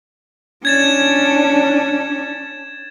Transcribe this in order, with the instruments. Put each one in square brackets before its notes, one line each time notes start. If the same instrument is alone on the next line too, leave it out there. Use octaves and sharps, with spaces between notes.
[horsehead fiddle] C#4 D4 [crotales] G#6 A6 E7